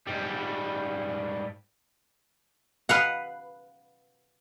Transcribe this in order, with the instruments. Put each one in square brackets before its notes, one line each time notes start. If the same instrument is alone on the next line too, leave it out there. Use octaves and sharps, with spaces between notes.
[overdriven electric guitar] G#2 G3
[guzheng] B4 F5 F#5